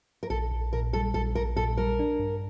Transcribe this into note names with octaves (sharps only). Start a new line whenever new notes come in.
A#4
A#1 A4
A#1
A#2 A#4
G3 A4
A#1 A4
A#1 A#4
A#2 A4
G3 A#4
D4
G2